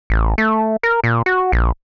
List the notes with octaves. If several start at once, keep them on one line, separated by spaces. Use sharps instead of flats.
A1
A3
A#4
A#2
F#4
A#1